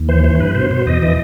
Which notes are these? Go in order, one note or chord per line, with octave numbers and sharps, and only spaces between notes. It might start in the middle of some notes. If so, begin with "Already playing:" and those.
Already playing: D#2
E3 C5
E3 C5
G2 B4
B2 C5
B2 C5
E2 D#5
E3 D#5